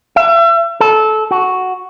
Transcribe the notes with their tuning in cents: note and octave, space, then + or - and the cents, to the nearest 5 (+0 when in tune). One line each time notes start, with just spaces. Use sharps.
E5 +35
A4 -20
F#4 +0